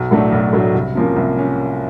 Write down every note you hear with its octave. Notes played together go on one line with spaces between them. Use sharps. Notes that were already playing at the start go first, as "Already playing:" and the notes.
Already playing: B1
A2 F#3 A3 D4
B1
A2 F#3 A3 D4
C2
C3 F3 A#3 C#4
C2
C#4